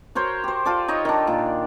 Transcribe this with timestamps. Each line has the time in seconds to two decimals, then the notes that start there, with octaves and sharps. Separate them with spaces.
0.15 F#4 A#4 C5 C#5
0.44 G4 C5
0.65 F4 A4 D5
0.88 D#4 C#5 D#5
1.05 D#3 D4
1.27 A#2